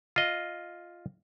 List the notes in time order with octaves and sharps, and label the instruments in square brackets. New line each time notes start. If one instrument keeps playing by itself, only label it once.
[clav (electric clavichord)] F4 D#5